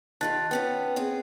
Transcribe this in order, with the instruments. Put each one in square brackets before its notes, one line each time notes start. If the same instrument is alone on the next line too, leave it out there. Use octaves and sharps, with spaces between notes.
[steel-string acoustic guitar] D#3 F4 G4 [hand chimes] A5 F#6 A6
[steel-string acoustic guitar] B3 C#4 B4 [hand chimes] G5
[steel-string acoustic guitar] B3 C4 G#4